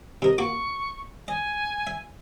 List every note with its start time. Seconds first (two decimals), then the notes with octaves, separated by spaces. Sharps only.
0.22 C3 A#4 D#5
0.38 A#3 F#4 C#6 D6
1.28 D#5 G#5
1.87 E5